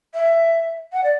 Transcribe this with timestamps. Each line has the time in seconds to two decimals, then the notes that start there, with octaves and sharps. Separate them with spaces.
0.14 E5
0.93 F#5
1.03 D5